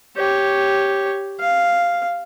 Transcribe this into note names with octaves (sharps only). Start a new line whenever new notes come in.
G4 C#5
F5